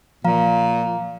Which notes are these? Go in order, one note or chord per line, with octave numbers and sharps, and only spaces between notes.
A#2 F3 F5 A#5